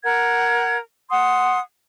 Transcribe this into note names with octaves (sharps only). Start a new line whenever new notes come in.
A#4 F#5 G#6
F#5 C6 D#6